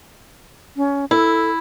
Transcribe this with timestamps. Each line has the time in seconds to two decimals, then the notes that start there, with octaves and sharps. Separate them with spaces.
0.77 C#4
1.11 E4 A4